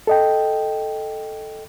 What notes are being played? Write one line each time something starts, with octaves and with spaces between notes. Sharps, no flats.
A4 D#5 G5